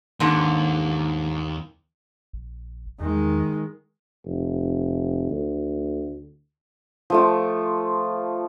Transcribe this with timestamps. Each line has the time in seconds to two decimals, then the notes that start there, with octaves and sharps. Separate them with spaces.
0.20 D#2 G#2 D3
2.33 A#1
3.00 E2 D#3 G#3
4.26 F1
5.31 D2
7.10 F3 A3 F4